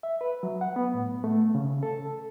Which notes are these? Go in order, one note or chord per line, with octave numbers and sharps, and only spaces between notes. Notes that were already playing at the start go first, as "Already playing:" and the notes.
E5
B4
F#3
F#5
B3
A2
A3
C#3
A4